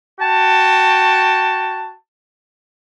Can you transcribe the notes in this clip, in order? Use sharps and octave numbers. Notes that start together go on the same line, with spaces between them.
F#4 G5 A5